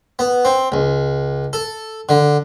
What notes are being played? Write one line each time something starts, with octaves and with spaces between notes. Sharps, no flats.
B3
C4
C#2
A4
D3